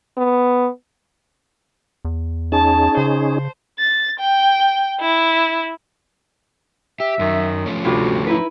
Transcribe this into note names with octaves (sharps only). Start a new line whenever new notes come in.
B3
E2
C#4 D#4 G#4 A5
C#3 C5
A6
G5
E4
G4 E5
F#2 D#3
F3 A3 C#4
D2 G2 C3 F4 F#4
D#4 E4 B4